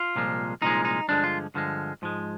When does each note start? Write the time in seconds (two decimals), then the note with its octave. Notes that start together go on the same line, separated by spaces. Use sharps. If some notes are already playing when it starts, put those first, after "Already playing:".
Already playing: F4
0.16 C2 A#2 F3 G#3
0.62 C2 A#2 F3 G#3 D#4
0.85 D#4
1.08 G2 D3 F3 G#3 D4
1.24 F4
1.54 G2 D3 F3 G#3
2.02 G#2 F3 G#3